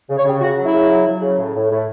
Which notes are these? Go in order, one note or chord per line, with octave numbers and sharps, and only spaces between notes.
C#3
C#5
C#3 G4
C#3 F#4
F#3
E4
C#3
F#3
F#3
C#3
A2
A2
A2